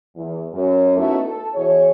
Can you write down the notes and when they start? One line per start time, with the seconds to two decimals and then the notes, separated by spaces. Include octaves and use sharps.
0.16 E2
0.53 F#2
0.97 A3 B3 C#4 D#4 E4 F#4
1.25 A4
1.54 B2 E3 G#4 C#5